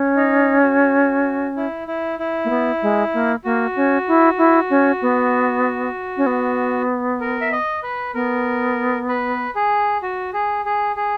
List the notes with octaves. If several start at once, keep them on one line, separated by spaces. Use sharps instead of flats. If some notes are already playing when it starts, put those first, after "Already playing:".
Already playing: C#4
D#4
F#4
E4
E4
E4
A#3
B3
G#3
A#3
A#3 F#4
C#4
E4
E4
C#4
B3
C#4
B3
A#4
E5
D#5
B4
B3 A#4
B4
G#4
F#4
G#4
G#4
G#4